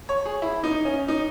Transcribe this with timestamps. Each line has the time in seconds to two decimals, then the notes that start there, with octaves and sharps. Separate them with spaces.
0.09 C#5
0.25 G#4
0.42 E4
0.64 D#4
0.85 C#4
1.08 D#4